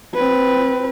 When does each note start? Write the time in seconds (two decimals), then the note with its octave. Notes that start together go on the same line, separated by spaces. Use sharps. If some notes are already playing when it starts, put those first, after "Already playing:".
0.15 C4 B4